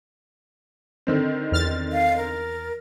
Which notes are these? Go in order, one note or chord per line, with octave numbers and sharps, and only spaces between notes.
D3 D#3 C4
E2 F6 A6
F5
A#4